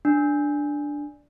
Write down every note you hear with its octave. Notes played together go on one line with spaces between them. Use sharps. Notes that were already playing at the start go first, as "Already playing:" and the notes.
D4